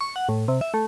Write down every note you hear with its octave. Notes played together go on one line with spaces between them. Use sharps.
C#6
F#5
A2
C3
E5
A3